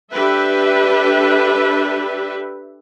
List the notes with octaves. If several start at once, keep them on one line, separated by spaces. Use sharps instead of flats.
D4 G4 A4 B4 E5